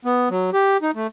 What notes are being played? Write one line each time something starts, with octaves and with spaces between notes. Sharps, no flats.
B3
F#3
G4
D#4
A3